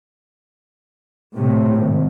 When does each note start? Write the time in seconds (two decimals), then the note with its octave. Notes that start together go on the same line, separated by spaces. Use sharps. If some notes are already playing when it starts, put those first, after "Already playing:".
1.35 A2 C3
1.75 G#1